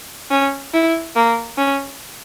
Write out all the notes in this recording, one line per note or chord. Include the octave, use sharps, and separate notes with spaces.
C#4
E4
A#3
C#4